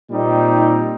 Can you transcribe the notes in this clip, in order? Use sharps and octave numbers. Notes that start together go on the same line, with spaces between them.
A#2 G3 C4 D#4